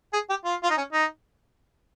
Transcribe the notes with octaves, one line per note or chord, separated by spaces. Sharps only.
G#4
G4
F4
F4
D#4
C#4
D#4